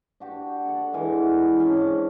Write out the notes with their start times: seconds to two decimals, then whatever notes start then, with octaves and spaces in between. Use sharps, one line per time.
0.20 D4 F#4 G4
0.65 A4 F#5
0.93 E3 G#3
1.56 C#4 D4
1.77 G#2 D6